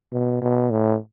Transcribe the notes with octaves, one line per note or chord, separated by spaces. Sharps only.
B2
B2
A2